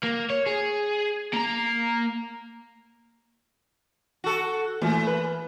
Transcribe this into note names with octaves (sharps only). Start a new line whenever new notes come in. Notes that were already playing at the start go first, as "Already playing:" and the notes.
A#3
C#5
G#4
A#3 A#5
F#4 A4
A#2 E3 A3
B4